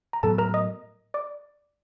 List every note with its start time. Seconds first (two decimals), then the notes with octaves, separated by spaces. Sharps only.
0.13 A#5
0.23 A2 F#3 B3 A4 A5
0.38 A#4 A#5
0.54 D#5 D#6
1.14 D5 D6